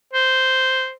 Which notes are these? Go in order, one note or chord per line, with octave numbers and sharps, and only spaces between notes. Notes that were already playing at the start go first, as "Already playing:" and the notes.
C5